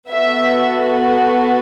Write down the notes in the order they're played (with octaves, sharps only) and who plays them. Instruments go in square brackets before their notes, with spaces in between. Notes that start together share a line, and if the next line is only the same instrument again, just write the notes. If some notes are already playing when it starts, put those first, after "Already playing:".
[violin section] B3 F#4 A4 E5